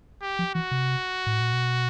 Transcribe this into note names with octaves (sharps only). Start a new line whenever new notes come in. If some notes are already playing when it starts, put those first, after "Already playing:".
G4
F3
E3 F#4
C3
A2
A#2
B2